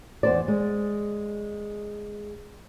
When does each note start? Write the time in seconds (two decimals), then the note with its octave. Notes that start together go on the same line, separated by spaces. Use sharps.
0.23 E2 C5 D5
0.48 G#3